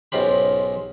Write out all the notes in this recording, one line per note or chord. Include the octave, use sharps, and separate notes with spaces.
B1 G#2 C#4 F4 G4 B5